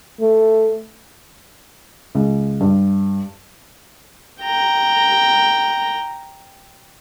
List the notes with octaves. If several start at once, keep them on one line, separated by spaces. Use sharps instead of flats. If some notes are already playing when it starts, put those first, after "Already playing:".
A3
C#2
G2
G5 A#5